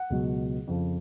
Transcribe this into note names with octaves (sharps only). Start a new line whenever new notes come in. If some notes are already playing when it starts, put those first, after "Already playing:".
Already playing: F#5
C#2 B2 F#3
F2 C#3 F3